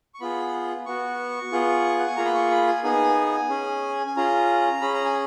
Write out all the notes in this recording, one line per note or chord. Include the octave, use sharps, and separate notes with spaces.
C#6
B3 F4 G#4 B5
B3 F#4 C#6
B3 F4 G#4
F#5
G#5
A#3 F4 G#4 A#5
B5
C#6
B5
G#5
B3 D#4 G#4 G#5
C#4 G#4
G#5
C#4 F4 G#4 A#5
C#4 G#4 B5
A#5
G#5